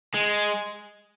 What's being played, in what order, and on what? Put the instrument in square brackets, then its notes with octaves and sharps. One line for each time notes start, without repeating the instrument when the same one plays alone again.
[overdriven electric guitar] G#3